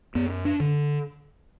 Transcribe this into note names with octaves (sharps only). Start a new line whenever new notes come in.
F#2 B3
D4
D3